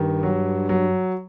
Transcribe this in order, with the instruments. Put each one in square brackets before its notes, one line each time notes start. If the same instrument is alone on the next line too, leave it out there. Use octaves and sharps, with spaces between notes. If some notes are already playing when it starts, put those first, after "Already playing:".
Already playing: [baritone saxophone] G2 [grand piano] D#3
[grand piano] F#3
F#3